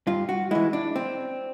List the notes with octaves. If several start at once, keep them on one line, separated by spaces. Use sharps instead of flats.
G2 F4
F#4
E3 G#3 E4
D4
C4